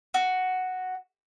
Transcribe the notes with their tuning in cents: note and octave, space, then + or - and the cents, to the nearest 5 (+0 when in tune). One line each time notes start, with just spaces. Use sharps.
F#4 +0